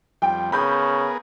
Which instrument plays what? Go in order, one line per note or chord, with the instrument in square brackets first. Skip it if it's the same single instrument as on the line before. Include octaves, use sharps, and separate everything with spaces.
[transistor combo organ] F2 G3 [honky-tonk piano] G5
[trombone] C#3 [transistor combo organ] B3 G#4 A#4 [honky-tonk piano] B5 G6